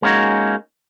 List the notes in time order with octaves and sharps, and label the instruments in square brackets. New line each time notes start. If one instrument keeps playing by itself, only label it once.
[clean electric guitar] G#3 A#3 C#4 D#4 F#4